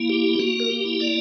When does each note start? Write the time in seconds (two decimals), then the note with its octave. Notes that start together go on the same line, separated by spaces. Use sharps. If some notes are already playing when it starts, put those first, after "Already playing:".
Already playing: A#3 E4
0.09 G4
0.39 A#3 F#4
0.60 A#4
0.70 G4
0.85 E4
1.00 D5